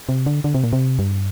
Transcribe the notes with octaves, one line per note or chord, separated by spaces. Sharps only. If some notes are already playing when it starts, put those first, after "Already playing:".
C3
D3
D3
C3
A#2
C3
G2